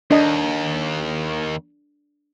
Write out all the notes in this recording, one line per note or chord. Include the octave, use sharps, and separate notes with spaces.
D#2 D4 D#5